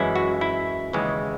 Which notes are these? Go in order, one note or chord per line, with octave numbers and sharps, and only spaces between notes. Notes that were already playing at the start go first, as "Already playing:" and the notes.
Already playing: F#2 E3 G#3 C#4 E4
F#4
E4
D#2 C#3 E3 G#3